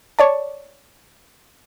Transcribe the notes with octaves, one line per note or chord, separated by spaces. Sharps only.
C#5 D5 A5